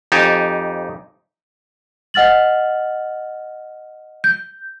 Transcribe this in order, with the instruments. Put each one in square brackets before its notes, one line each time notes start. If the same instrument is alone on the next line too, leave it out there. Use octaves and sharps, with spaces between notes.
[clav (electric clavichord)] F2 D#4 G4 G#5 A5
[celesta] D#5 F#5 F6 A6 F#7
G6